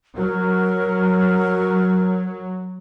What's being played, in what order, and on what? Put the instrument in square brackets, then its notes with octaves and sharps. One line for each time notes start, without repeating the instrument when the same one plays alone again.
[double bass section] F#3 [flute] A#4